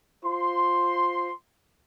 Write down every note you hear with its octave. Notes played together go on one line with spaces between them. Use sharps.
F4 C5 C6